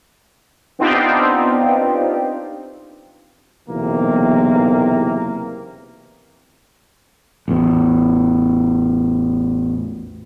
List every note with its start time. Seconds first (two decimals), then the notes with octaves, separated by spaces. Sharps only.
0.79 B3 C4 D4 D#4 F4 G4
3.68 F#1 B1 E2 C3 E3 A#3
7.48 A1 E2